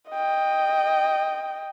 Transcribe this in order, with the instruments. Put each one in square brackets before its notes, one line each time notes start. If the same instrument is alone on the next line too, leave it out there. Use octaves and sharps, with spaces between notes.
[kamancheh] D#5 G5